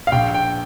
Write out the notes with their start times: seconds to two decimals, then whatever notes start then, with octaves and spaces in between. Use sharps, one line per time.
0.07 F5
0.12 A#1 G5
0.34 G5